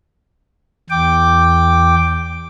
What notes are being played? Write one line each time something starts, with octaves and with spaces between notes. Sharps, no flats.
E2 G5 D6